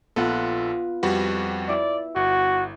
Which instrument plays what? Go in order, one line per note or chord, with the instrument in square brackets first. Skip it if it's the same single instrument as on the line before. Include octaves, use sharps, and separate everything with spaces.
[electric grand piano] A#1 A4 [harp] B3 F4 F#5
[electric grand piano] F2 G3 F#4 [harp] B4
[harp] E4 [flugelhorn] D5
[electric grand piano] G1 [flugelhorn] F#4